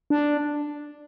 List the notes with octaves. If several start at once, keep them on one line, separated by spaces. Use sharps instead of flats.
D4